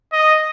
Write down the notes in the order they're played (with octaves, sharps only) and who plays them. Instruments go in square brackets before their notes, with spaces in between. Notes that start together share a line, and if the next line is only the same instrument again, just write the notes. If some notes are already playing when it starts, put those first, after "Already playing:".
[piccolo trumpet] D#5